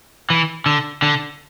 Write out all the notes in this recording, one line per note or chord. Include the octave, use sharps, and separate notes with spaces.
E3
D3
D3